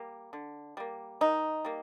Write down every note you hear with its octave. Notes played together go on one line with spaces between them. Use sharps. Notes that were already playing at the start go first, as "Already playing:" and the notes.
Already playing: G3 A#3
D3
G3 A#3
D#3 D#4
G3 A#3